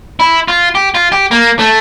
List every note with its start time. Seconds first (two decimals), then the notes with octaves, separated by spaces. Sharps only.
0.20 E4
0.48 F4
0.75 G4
0.95 F4
1.12 G4
1.31 A#3
1.59 A3